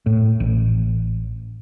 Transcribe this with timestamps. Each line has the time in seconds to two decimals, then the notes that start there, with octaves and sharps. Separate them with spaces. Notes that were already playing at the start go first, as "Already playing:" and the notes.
0.06 A2
0.40 A1